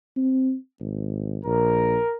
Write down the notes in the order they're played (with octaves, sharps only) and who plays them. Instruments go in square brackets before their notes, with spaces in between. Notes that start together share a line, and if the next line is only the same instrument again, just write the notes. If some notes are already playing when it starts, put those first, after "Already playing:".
[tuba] C4
G#1
[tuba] A#1 [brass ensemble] A#4